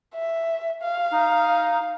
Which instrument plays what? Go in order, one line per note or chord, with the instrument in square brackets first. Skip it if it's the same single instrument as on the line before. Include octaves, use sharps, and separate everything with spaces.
[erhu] E5
F5
[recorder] D#4